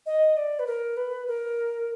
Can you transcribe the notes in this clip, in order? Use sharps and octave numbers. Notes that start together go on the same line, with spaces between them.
D#5
D5
B4
A#4
B4
A#4